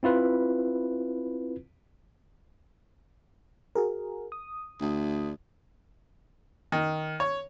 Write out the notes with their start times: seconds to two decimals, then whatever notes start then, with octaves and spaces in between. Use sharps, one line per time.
0.03 C4 E4 F4 B4
3.75 F#4 G#4 A#4
4.32 D#6
4.81 D2
6.72 D#3
7.20 C#5